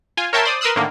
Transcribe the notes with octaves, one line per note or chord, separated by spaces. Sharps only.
F4 G#5
A#4 C#5 E5 G5 A5 C6
C5 D5 D#6
A#4 B4 C6 D#6 E6 F#6
A2 D3 D#3 A#3